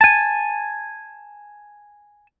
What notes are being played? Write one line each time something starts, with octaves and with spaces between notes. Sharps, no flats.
G#5 A5